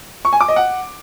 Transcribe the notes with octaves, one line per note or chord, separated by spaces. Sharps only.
C#6
G#5
D6
D#5
F#5